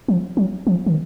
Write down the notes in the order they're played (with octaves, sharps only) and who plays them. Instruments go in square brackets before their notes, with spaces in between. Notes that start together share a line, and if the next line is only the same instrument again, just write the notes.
[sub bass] F3
F#3
F3
D#3